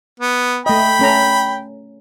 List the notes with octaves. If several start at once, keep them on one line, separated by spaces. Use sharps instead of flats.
B3
A3 D#5 G5 B5
A3 C#4 A#5